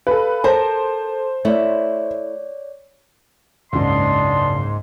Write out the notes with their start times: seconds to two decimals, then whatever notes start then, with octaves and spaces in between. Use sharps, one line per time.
0.07 A4 B4 F5
0.44 A4 A#4 C5 A5
1.45 A3 E4 C#5 D5
3.73 F#1 C#2 G#2 D4 D#5 C6